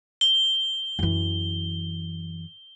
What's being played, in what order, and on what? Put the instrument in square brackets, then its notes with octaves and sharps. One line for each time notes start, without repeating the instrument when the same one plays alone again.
[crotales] G7
[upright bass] F#2 E3